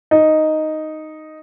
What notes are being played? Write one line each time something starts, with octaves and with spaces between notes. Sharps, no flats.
D#4